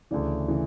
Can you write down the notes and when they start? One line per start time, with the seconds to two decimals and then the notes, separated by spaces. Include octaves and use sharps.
0.11 D2 C#3 E3 D5
0.48 C#3 E3